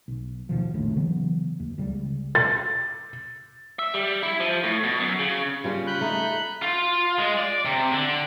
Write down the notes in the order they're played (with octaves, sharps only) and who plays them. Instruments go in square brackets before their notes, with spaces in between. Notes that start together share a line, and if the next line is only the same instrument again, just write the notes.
[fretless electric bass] B1
D#2 B2 F3
F1 A#1 D#2 A2
C#3 E3 F#3 B3
D#2
C#2 C#3 G3
[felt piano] A6
[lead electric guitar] E5
G3
E4
F3
A2
B2
F#2
C#3
[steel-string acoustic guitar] C#3 G3 C#4 [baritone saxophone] F4
[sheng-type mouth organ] B5 F#6 G6
[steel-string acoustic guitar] A3 [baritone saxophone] D#4
[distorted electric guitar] F4
G#3
D5
C3
D3